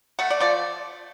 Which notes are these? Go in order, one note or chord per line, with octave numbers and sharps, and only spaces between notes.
A3 F#5
D5
F3 D5